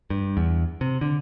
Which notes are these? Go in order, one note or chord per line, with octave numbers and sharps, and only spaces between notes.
G2
E2
C3
D3